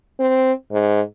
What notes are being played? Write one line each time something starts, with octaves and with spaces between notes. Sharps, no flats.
C4
G#2